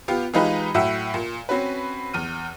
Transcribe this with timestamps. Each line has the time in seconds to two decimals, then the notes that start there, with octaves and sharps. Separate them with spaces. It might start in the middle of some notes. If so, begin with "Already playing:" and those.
0.08 B3 F4 G4 F5
0.34 E3 G#3 D#4 F4 G4 B4
0.75 A2 F#3 E5 F#5 G5 E6
1.14 A#2
1.49 C4 C#4 F#4 B4
2.13 E2 F6 D#7